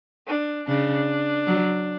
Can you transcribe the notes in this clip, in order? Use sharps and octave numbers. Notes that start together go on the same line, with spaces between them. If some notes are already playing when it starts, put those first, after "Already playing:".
D4
C#3 D4
F#3